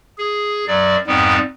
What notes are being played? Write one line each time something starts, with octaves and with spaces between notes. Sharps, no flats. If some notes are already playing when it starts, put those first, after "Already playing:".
G#4
F#2 F#3 D5
F2 G#2 G3 B3